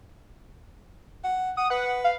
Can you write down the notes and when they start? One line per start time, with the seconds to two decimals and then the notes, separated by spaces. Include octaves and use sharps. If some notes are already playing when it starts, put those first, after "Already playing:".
1.24 F#5
1.57 F#5 D#6
1.70 B4 F#5
2.04 F5